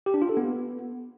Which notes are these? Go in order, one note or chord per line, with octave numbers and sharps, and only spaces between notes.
G4
D4
F4
A4
B3